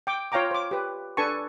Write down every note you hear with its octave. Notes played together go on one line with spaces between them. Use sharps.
G5 D6
F4 C#5 F5 G5 A#5 D6
C5 D6
G4 B4
D4 A4 B4 G#5 A5 C#6